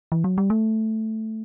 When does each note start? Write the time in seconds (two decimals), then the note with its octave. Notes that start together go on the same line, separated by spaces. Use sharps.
0.12 E3
0.24 F#3
0.38 G3
0.50 A3